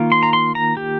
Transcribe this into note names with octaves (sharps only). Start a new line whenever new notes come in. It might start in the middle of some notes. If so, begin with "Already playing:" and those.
Already playing: D#3 A#3 F4
C6
A#5
C6
A#5
G4